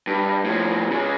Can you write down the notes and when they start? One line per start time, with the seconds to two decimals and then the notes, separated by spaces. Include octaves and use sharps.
0.07 G2
0.44 A2 F3
0.91 C#3 G#3